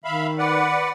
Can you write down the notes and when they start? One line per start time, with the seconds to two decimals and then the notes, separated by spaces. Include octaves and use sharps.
0.04 D#3 E5 F5 B5
0.38 B4 D5 F#5